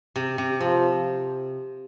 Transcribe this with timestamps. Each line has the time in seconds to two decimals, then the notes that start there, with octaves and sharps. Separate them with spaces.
0.16 C3
0.38 C3
0.60 C3 F3